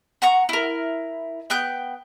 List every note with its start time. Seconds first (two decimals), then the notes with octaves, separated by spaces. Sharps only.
0.22 F#5 A#5 C#6
0.49 E4 A#4
1.50 B3 G5 F#6 G6